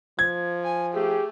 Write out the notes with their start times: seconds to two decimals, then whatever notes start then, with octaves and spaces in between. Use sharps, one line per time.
0.19 F3 G#6
0.64 G#5
0.94 A3 G4 G#4